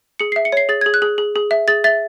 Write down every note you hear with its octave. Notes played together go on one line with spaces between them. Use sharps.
G#4 C#7
C7
E5
C#7
C#5 C7
G#4 A6
G#6
G#4
F#6
G#4
G#4
G#4
E5
G#4 A6
E5 A6